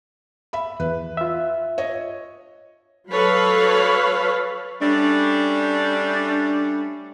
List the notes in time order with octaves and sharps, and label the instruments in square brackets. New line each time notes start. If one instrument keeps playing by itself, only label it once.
[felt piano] E5 B5
[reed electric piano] E2 [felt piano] B4
[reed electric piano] F4 E5
[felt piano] C#5 D#5
[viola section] F#3 A4 B4 C#5 F5 B5
[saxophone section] G3 A3 C#4 D4